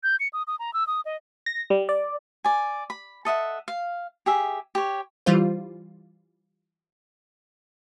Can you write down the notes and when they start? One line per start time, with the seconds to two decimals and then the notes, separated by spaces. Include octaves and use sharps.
0.03 G6
0.20 C#7
0.33 D#6
0.47 D#6
0.59 A#5
0.74 E6
0.87 D#6
1.05 D#5
1.46 A#6
1.70 G3
1.89 D5
2.44 D5 G#5
2.90 B5
3.25 A4 D#5 E5 F#5
3.68 F5
4.26 G4 G#4 E5
4.75 G4 C#5
5.26 E3 G3 F4 C5